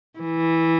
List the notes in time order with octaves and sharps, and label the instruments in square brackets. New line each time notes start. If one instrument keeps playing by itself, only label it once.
[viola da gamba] E3